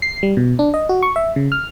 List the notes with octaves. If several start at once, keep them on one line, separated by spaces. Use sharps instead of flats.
C7
G3
B2
D4
D#5
F#4
C#6
E5
C#3
F6